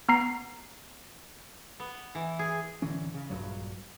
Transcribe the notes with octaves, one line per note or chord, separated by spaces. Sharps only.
B3 A#5 C7
B3
E3
G#4
D1 D3 E3 C#4
C#3
A#1 E2 G2 F#3